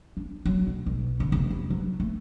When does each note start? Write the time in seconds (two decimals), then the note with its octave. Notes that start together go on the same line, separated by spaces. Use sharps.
0.17 D4
0.45 F#3
0.67 B1
0.86 B1
1.20 D3
1.32 F1
1.50 E4
1.70 F#3
2.00 A3